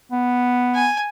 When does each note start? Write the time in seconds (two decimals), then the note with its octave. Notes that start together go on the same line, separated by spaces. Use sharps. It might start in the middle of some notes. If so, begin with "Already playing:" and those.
0.11 B3
0.75 G#5